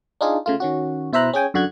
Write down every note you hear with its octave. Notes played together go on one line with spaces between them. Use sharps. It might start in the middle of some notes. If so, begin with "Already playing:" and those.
D4 D#4 F4 G#4
C#3 A3 F4
D#3 C#4 F#4
B2 E4 C5 E5 A#5 F#6
C#4 G#4 G5 G#5
F#2 D3 F#4 F#6 G#6